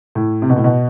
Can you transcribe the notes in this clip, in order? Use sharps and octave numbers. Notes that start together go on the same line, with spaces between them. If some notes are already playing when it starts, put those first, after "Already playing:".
A2
C3
B2
A2
B2